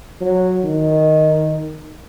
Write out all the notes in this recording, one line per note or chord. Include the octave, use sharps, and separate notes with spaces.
F#3
D#3